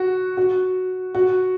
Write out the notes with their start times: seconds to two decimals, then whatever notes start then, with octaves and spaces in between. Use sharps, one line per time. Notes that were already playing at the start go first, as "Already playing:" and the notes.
Already playing: F#4
0.37 F#4
1.15 F#4